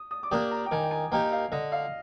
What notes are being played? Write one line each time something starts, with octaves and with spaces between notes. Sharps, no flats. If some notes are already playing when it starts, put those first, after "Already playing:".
Already playing: D#6
D#6
D6
A#3 D4 G4 D5 D#6
A#5
G5
D#3 G#5
G5
G#5
A#3 D#4 G4 G5
F5
D3 D#5
F5